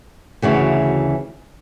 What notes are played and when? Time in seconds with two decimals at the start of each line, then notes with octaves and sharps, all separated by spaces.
0.42 D2 C#3 E3 F#4